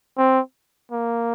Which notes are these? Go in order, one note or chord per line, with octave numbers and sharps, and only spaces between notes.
C4
A#3